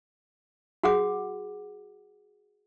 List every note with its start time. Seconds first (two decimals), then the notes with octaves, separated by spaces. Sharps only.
0.83 F#4 G#4 F#5 D6